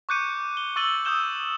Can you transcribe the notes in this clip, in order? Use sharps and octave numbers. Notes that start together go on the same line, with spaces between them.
C#6 D6 F#6 G6 C#7 D#7
G7
C#6 E6 A6 D#7 F#7 G7
D#6 E6 G6 E7 G7